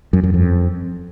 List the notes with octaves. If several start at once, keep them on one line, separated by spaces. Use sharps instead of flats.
F#2
F#2
F2